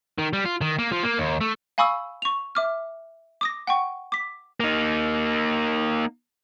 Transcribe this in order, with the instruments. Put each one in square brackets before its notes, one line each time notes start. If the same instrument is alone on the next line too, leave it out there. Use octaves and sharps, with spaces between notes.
[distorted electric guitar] D#3
G3
F4
D#3
A#3
F3
A#3
D#2
A3
[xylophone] F5 G#5 B5 C#6 D#6 E6
C#6 F7
E5 D6 F6
D6 D#6 A#6
F#5 G5 C#6
D6 B6
[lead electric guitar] A#3 D#4